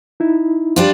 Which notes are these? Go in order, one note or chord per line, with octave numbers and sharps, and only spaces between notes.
D#4 E4
G3 D4 F4